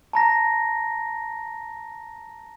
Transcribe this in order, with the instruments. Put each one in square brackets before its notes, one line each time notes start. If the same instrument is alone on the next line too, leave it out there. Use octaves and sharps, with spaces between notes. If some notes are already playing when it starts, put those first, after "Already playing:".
[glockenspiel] A5 A#5 A#6